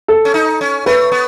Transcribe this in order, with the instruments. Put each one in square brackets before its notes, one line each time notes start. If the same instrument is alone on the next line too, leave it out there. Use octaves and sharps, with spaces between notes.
[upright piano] A4
[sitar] C#4
D#4
C#4
[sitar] A3 [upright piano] B4
[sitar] B3